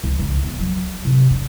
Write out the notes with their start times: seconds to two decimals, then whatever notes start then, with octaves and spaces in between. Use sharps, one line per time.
0.04 C#2
0.19 C#2
0.44 E2
0.59 F#3
1.05 C3
1.31 D4